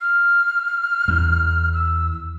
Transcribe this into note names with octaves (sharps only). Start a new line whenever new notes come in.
F6
E2
E6